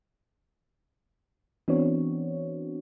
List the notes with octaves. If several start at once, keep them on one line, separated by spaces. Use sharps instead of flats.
E3 B3 C4 D4 F#4 C#5